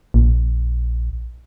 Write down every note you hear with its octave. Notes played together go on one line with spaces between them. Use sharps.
A#1